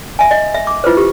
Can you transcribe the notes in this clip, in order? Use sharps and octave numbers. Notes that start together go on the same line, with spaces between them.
E5 G#5
D#5
E5
D6
E4 F4 B4 C5
G4